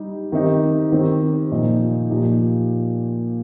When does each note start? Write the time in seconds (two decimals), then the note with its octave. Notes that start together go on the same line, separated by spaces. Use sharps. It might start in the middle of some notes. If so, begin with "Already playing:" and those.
Already playing: G3 D#4 G4
0.32 D#3 C4 D#4 G4
0.92 D#3 C4 G4
1.51 A#2 F3 D#4
2.10 A#2 F3 D#4 G4